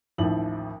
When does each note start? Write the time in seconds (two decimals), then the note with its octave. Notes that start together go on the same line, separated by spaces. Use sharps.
0.18 A1 D#2 F3 E4 F#7